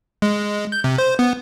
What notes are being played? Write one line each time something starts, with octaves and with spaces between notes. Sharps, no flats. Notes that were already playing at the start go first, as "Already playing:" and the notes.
G#3
G6
C3
C5
B3